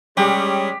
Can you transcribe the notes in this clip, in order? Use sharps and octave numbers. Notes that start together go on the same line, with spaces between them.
G3 G#3 C#4 G4